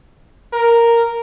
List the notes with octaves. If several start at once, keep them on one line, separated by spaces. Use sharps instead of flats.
A#4